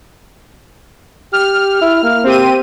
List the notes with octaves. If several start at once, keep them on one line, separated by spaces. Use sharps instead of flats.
G4 F6
E4
A#3
C4 G4 D#7